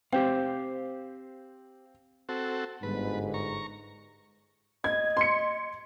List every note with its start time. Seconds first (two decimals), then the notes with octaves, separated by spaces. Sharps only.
0.13 C4 G4 C5 F5 G5
2.29 C4 F#4 A4
2.83 G1 G#2 B4
3.34 A#5 C#6
4.84 D#5 G#6
5.17 C6 C#7